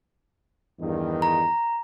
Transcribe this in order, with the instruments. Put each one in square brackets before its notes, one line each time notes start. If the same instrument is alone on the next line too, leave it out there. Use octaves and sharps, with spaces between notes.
[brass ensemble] E2 G2 D#3
[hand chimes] A#5